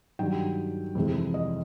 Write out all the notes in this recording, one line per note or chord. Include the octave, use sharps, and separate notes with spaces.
G2 D#3 F#3 G5
F2 C3 E3 G#3
D#5